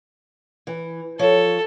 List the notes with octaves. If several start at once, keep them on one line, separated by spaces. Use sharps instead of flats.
E3
F3 A4 C#5